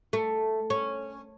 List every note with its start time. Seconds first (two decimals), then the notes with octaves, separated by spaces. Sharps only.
0.13 A3
0.70 C#4